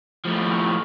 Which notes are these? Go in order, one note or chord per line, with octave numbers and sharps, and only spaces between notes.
A2 F3